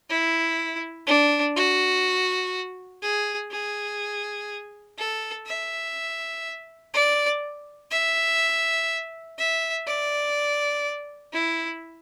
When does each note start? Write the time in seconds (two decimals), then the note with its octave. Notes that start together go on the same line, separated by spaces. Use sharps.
0.10 E4
1.07 D4
1.56 F#4
3.03 G#4
3.51 G#4
4.98 A4
5.47 E5
6.94 D5
7.91 E5
9.38 E5
9.87 D5
11.33 E4